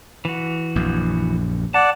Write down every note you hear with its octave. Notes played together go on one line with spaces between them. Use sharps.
E3 F#4
A#1 F#2
D5 F#5 A5